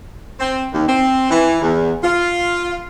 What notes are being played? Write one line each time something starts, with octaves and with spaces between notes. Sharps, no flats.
C4
D#2
C4
E3
E2
F4